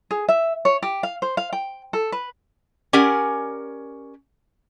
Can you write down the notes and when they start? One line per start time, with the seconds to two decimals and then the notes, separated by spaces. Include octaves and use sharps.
0.11 G#4
0.29 E5
0.65 C#5
0.82 G4
1.03 F5
1.22 C5
1.37 F5
1.53 G5
1.93 A4
2.12 B4
2.93 C#4 G4 A#4 D5 F#5 G#5